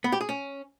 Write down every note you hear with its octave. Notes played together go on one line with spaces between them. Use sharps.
B3
G4
G#4
C#4